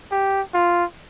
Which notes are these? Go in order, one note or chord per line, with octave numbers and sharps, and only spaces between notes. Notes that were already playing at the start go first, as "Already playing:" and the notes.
G4
F4